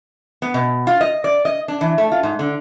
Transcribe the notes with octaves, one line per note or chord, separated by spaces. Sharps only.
B3
B2
F4
D#5
D5
D#5
D4
E3
A3
F4
G#2
D3